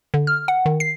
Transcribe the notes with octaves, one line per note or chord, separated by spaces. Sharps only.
D3
F6
F#5
D#3
C7